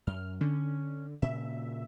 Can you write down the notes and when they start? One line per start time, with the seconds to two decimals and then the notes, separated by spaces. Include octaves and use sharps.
0.07 F#2 F6
0.41 D3 C#4
1.22 A#2 C#3 E5